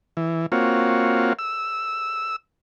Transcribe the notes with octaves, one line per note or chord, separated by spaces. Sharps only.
E3
A#3 C4 F4 F#4 C#5
E6